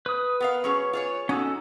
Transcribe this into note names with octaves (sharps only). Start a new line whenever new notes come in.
B4 D#6
B3 A#4 F5
F#3 C#4 G#4
F4 G#4 C#5
C#4 D#4 F#4 A4